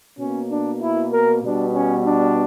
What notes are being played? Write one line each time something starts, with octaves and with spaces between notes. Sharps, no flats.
B2 A#3 C#4
D4
E4
A#4
B2 G3 B3 D4
C#4
D4